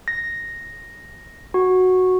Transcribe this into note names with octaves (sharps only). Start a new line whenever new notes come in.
A#6
F#4